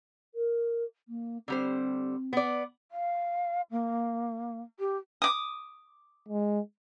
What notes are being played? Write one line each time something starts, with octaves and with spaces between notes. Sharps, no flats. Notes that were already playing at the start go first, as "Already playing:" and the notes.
A#4
A#3
D3 G3 C4 C5
B3 D5
F5
A#3
G4
D6 D#6
G#3